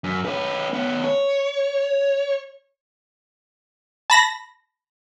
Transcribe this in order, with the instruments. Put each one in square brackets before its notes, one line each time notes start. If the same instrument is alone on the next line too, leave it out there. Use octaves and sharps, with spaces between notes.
[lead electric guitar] F#2
C#4 B4
B3 C#4
C#5
[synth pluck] A5 B5 A#6